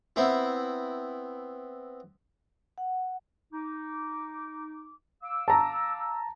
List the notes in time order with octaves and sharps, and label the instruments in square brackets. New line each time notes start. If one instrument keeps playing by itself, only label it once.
[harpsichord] B3 C4 E4
[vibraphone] F#5
[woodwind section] D#4 D6
F5 D6 E6
[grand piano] A5 A#5